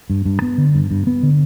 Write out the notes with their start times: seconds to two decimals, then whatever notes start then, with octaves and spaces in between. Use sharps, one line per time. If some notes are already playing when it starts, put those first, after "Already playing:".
0.10 G2
0.25 G2
0.42 B3
0.58 D3
0.75 G2
0.91 G2
1.07 B3
1.23 D3